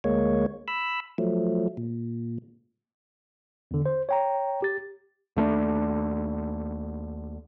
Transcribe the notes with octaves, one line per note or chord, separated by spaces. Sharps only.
D2 G#3 A#3 C#5
B5 E6
F3 F#3 A3
A#2
E2 D3
C5
C#5 G5 A#5
G4 A6
D#2 A3 C#4 D4